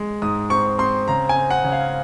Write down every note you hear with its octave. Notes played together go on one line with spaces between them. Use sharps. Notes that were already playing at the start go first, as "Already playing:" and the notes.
Already playing: G#3
G#2 D#6
C4 C#6
C4 C6
C#3 A#5
G#5
C4
F#5
C#3
F5